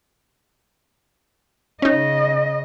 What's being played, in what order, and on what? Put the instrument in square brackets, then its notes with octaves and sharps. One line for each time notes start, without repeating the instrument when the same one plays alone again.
[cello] C#3 D#5 [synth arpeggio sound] C#4 D#4